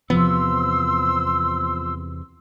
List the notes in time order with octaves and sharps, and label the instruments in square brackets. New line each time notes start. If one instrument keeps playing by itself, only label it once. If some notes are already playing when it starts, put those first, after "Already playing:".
[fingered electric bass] E2 C3 B3 [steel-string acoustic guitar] F3 [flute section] C6 E6